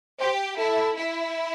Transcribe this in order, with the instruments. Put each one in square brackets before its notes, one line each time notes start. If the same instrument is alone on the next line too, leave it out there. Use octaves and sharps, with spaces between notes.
[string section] G4 [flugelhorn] C5
[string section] E4 [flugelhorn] A4
[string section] E4